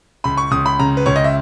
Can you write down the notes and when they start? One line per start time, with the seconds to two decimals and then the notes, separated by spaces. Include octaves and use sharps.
0.24 C#2 B5
0.37 C#6
0.51 C#2 D#6
0.66 B5
0.79 C#3 A#5
0.97 B4
1.06 C#2 C#5
1.16 D#5
1.24 E5